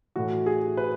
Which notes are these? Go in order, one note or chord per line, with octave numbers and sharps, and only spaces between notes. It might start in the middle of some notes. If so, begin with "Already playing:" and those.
A2 E3 F#4
G#4
B4